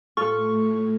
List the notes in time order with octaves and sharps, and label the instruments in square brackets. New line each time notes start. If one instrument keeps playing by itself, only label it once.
[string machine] A2 [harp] F4 A4 F6 [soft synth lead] C#6